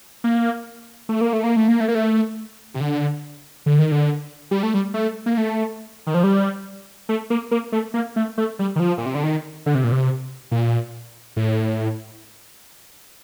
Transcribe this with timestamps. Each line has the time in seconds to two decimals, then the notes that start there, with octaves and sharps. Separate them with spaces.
0.24 A#3
1.09 A3
1.21 A#3
1.33 A3
1.44 A#3
1.56 A3
1.68 A#3
1.80 A3
1.88 A#3
1.95 A3
2.74 C3
2.80 D3
3.66 D3
3.79 D#3
3.92 D3
4.51 G3
4.63 A3
4.74 G3
4.94 A3
5.26 A#3
5.37 A3
6.07 D#3
6.14 F3
6.24 G3
7.09 A3
7.30 A#3
7.51 A#3
7.72 A3
7.94 A#3
8.16 A3
8.38 A3
8.59 G3
8.76 D#3
8.79 F3
8.98 A#2
9.06 C3
9.15 D3
9.23 D#3
9.66 D3
9.75 C3
9.84 A#2
9.92 C3
10.51 A#2
11.36 A2